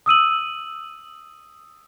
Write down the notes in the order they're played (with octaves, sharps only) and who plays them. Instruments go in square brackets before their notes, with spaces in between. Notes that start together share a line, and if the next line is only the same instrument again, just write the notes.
[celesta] D#6 E6 D#7 F#7